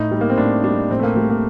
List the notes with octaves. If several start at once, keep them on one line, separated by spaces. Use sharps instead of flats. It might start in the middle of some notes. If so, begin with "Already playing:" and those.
Already playing: A2 D#4
G3
A#3
C4
A2 D4
G3 D4
A2 C4
A3
A#3
G3 A3
A#3